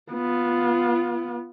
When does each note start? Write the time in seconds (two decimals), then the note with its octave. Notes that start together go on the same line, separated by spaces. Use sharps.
0.12 B3 F4